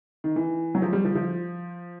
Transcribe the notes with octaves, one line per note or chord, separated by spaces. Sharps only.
D#3
E3
F#3
F3
G3
F3
F3